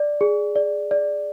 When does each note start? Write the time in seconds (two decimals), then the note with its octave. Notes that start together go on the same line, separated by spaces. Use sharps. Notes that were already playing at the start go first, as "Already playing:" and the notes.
Already playing: D5
0.21 G#4
0.56 D5
0.91 D5